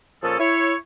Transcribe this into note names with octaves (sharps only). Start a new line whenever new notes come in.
A#2 F3 C#4 G#4 A4
E4 C#5